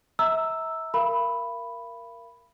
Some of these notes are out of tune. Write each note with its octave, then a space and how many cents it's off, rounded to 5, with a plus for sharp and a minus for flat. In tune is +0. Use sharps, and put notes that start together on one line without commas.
E5 -35 A#5 -10 E6 +0
A#4 +0 F5 -40 B5 +0